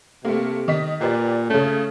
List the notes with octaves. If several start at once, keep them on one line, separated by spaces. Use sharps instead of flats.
C3 A3 A#3
D#3 D#5 B6
A#2 G4 B4 D5
C#3 A3 C#4